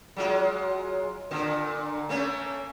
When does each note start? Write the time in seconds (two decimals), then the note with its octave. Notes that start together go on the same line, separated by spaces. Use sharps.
0.16 F#3 G#3 F4
1.31 A#2 D3
2.09 A3 A#3 C#4